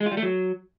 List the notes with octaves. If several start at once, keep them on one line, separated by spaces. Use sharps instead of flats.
G#3
F4
G3
A3
F#3